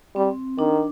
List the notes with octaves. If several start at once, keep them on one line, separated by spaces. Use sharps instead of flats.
G3 C4
D#3 D4